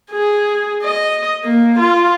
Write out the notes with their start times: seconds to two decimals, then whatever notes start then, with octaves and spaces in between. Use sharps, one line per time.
0.12 G#4
0.83 D#5
1.45 A#3
1.80 F4